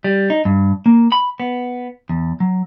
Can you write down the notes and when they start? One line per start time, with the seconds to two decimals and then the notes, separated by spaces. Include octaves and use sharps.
0.04 G3
0.30 D#4
0.45 G2
0.86 A#3
1.12 B5
1.40 B3
2.09 E2
2.40 F#3